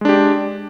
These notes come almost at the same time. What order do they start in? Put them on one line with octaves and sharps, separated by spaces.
G#3 D4 G4